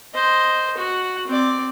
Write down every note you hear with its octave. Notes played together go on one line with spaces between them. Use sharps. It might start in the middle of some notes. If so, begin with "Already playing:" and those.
C5 D#5
F#4 F#5
C4 D5